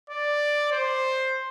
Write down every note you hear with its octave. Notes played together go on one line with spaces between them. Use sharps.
D5
C5